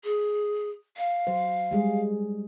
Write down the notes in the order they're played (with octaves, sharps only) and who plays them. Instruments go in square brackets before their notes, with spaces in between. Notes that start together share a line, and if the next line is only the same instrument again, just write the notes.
[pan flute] G#4
F5
[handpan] F#3 C5
G3 G#3 G#4